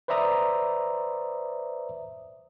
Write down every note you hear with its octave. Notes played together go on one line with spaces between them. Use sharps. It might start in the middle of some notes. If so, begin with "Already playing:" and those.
B4 C5 D5 E5 A#5 D#6